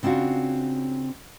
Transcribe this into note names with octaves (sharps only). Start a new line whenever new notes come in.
C#3 C4 D4 F4 F#4